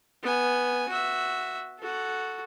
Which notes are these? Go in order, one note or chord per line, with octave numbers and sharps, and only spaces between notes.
B3 G#5
F#4 E5
F#4 A4